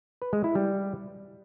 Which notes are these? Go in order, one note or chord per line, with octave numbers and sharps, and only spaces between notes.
B4
G#3
E4
G3